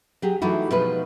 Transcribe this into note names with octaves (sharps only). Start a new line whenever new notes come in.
F#3 G4 G#4
E3 F#3 A3 D#4 E4 F#4
B2 F3 F#3 G#3 D#4 B4